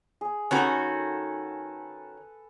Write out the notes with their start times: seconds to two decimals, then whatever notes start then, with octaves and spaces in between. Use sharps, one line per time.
0.21 G#4
0.51 D#3 C#4 F#4 A4 B4